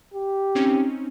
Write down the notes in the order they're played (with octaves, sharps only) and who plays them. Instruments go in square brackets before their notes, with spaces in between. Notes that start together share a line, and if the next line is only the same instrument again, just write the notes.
[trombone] G4
[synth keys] C4 C#4 D#4